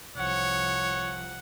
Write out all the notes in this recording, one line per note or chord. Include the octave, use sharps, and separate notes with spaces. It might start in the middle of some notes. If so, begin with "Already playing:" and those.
C2 F3 C#5 F#5